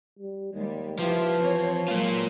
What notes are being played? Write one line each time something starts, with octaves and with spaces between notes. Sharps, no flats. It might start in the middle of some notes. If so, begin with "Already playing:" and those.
G3
D#2 G3 G#3
F3 E4 F4 G4 B4
E3 C4 C#5
F#3 G#3 A#3 F4